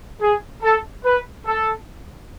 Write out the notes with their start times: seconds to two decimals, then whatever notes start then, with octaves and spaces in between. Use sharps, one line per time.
0.21 G#4
0.63 A4
1.04 B4
1.46 A4